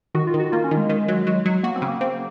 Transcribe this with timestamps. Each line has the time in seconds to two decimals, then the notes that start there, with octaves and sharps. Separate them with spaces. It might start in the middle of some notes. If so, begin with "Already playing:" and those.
0.14 D#3 F#4
0.27 F4
0.34 D#3
0.40 F#4
0.52 A#3 F4
0.64 C#4
0.71 D#3
0.77 G#3
0.89 D#3
1.08 F#3
1.27 F#3
1.45 F#3
1.63 A#3 F#4
1.76 C4
1.82 C#3
1.88 A#3
2.01 A#3 C4